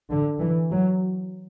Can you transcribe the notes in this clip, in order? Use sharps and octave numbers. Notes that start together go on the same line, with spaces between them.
D3
E3
F#3